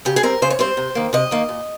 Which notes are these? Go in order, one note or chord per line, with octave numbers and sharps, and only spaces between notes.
C#3 G4
G#4
G3 C4 A#4
C#3 C5
C#5
G3 C4 C5
C3
D#3 A#3
C3 D#5
D#3 A#3
A#2